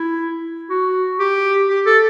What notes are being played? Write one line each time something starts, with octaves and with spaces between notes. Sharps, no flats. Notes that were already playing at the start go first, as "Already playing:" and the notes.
Already playing: E4
F#4
G4
G4
A4